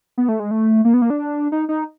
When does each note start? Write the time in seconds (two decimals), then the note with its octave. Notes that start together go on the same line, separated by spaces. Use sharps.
0.18 B3
0.29 A3
0.40 G#3
0.51 A3
0.85 A#3
0.94 B3
1.02 A#3
1.10 D4
1.52 D#4
1.69 D#4